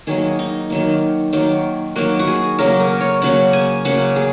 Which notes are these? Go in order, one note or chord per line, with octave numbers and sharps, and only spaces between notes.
D#3 F#3 A#3 G#4
D#4
D#3 F#3 A#3
D#3 F#3 A#3
D#3 F#3 A#3 F#4
F#4
G#4
C#3 F#3 A#3 A#4
A#4
C#5
C#3 F#3 A#3 F#5
G#5
C#3 F#3 A#3 F#5
G#4